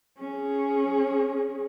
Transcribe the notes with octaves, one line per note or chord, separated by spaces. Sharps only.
C#4 G#4